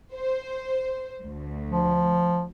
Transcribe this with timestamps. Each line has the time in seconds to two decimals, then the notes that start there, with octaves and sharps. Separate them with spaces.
0.14 C5
1.24 D2
1.70 F3